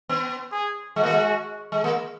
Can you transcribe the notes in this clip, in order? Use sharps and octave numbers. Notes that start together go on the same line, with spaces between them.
B3
G#4
G#3 F#4
A#3
G#3
G#3
A#3